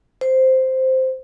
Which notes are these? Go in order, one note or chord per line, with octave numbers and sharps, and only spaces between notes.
C5